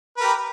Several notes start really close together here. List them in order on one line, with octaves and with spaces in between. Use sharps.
B4 A#4 G4